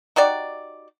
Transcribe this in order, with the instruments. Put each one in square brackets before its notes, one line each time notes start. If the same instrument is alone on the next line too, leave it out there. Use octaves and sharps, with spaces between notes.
[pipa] D#4 F#4 G4 D5